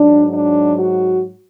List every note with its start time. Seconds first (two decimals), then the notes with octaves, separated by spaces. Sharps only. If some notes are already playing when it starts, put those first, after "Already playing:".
Already playing: G#2 F#3 D4
0.31 D4
0.78 F#4